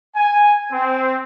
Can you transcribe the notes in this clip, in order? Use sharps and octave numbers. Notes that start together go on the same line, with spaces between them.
G#5
C4